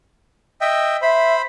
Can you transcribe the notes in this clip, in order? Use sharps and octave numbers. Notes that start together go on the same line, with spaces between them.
D#5 E5 G5
C5 E5 B5